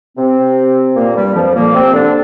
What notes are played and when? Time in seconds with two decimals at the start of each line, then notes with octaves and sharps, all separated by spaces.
0.17 C3 C4
0.95 A#2 A#3
1.15 G2 G3
1.34 F2 F3
1.55 A#2 A#3
1.74 C3 C4
1.93 D3 D4